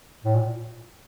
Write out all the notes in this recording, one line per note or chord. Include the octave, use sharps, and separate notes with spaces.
A2
A#2